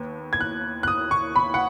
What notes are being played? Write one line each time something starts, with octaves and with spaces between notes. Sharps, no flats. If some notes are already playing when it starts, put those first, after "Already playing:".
Already playing: D#2 B3
G#6
F#6
F#6
D#6
C#6
B5
F#5